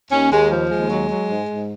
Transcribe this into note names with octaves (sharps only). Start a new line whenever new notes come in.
D#2 C#4
D#2 G#3
F3
D#2 G#3
F#3
F#3
G#2
G#2